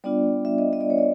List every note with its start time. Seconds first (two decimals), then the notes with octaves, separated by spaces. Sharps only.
0.04 G3 B3 D4 F4 D5
0.45 E5
0.58 D#5
0.73 D#5
0.81 D5
0.90 C#5
0.98 D5